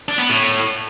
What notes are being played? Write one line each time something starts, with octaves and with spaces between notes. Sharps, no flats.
D4
B3
A2